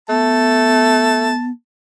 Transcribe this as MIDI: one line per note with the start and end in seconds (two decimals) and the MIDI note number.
0.09 1.32 57
0.09 1.51 59
0.09 1.48 81